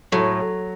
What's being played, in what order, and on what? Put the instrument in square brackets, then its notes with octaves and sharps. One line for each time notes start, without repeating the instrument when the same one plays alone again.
[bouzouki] A2 [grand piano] F#3